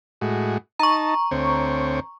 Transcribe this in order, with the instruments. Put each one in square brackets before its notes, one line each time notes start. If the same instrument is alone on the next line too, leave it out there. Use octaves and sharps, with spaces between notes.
[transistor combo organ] A2 G#3 F#4
[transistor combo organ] D#4 A5 [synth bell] A#5 C#6
[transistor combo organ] D2 C4 C#5